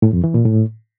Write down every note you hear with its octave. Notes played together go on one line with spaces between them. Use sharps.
A2
F2
E3
A#2
A2